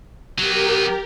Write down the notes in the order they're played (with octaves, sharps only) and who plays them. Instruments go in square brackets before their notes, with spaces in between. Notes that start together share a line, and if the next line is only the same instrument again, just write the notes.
[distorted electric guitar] F#3 B3 [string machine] G4 A#4